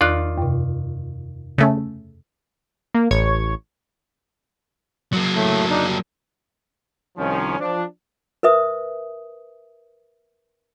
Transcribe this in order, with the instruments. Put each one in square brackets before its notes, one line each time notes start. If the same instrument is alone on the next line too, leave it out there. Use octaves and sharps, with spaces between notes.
[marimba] E2 F#6 [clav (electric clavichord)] D#3 F4 D5
[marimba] F#2 C3
[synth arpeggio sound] C#3 A3 C#4
[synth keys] A#3
A1 C#5 C#6 G#6
[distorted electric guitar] F#3 A#3
[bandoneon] A2 A3
D4 D#4
G3
[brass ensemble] C2 D#3 F3 C#4
F3 D4
[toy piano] A#4 B4 E5 D#6